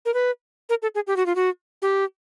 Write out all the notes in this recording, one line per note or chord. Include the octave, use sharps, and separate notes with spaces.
A#4
B4
A#4
A4
G#4
G4
F#4
F4
F#4
G4